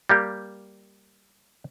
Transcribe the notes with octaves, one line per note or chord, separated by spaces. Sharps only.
G3 A#3 G4